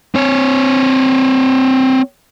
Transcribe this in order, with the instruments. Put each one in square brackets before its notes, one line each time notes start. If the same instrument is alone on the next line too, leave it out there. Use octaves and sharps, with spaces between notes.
[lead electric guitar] C4 C#5